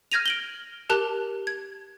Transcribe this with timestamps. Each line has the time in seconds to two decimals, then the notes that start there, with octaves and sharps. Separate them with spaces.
0.12 F6 G6 G#6 A#6 D#7 F7
0.26 D7 F#7 G7
0.90 G4 A#4 A5 F#6 F7
1.47 G#6